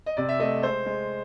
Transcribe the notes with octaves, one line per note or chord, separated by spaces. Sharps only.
D#5
C3 D5
E5
A3 D#5
G#3 C5
G#3